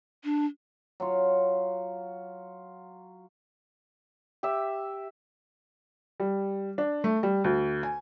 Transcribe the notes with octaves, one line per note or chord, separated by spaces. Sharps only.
D4
F#3 F4
G4 E5
G3
D4
A3
G3
D2
G#5